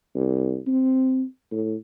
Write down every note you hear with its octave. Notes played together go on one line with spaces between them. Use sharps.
C2
C4
A2